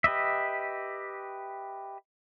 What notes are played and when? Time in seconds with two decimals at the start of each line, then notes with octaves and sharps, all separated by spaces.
0.04 G4 B4 D#5 E5